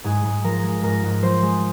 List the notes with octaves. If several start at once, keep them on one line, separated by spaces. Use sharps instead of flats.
G#2 G#4
G#2
F3 A#4
G#3
G#2 A#4
G#2
F3 C5
G#3